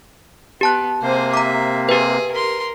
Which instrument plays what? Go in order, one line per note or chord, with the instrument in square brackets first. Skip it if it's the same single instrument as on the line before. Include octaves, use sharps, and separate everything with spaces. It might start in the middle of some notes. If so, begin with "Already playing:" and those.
[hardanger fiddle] B3 [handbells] G4 A5 F#6
[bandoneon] C3 A#3 [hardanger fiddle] G#4 C5
[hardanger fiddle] E5 [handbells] A#5 D6
[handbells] G4 B4 [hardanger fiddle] G#4
[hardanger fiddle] A#4 C6